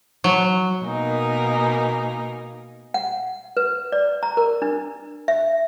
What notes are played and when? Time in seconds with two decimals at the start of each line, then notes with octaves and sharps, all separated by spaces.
0.24 F#3
0.84 B2 A#3 D#4 A#4 G#5
2.94 F#5
3.57 B4
3.92 D5
4.23 A#5
4.37 A#4
4.62 D4
5.28 E5